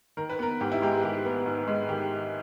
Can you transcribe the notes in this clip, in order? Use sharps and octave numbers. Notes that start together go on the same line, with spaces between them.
D#3 A#4
B4
B3 A#4
G#2 G4
E4
G#3 G4
D#3 G4
B3
G#2
G#3
D#3 G4